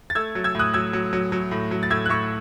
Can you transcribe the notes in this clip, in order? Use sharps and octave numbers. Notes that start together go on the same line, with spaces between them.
A6
A3 E6 G#6
F#3
E6 G#6
A2 D#6 F#6
F#3 E6 G#6
F#3
F#3
F#3
A2
F#3
A6
A2 E6 G#6
F#6
A2 C#6 E6